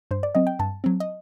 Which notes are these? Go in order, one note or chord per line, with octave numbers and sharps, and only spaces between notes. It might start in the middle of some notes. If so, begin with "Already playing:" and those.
G2 C5
D5
F#3 C4 D#5
G5
G2 A5
F#3 C4
D#5